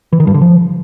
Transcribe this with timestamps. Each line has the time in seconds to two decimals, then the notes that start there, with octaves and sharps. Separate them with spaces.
0.13 E3
0.20 D#3
0.27 G2
0.34 D3
0.42 F3